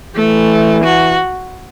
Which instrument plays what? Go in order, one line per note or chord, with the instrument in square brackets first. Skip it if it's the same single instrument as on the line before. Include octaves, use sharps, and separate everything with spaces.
[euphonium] E3 [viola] A3
[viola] F#4